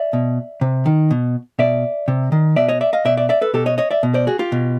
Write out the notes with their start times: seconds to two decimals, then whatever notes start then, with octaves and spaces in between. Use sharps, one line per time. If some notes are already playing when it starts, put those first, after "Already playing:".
Already playing: D5 E5
0.13 B2
0.61 C3
0.86 D#3
1.11 B2
1.59 B2 D5 E5
2.08 C3
2.32 D#3
2.56 B2 D5 E5
2.68 C#5 D#5
2.81 D5 E5
2.93 D#5 F5
3.05 B2 D5 E5
3.17 D5 E5
3.29 D5 E5
3.41 A4 B4
3.54 B2 G4 A4
3.66 C#5 D#5
3.78 C#5 D#5
3.91 D5 E5
4.03 B2
4.14 C5 D5
4.27 F#4 G#4
4.39 F4 G4
4.52 B2